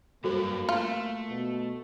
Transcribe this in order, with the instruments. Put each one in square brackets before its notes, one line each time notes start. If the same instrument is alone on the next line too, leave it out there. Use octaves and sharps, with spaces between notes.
[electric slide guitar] F#2 G3 B4 [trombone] A#3 [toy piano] F#4 A4 C5
[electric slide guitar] A3 [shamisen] F4
[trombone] B2